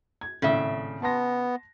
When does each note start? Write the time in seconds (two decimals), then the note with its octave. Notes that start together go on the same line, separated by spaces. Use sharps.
0.21 G#6
0.42 G#1 A2 C#3 E5
1.02 B3 A5 C6 A#6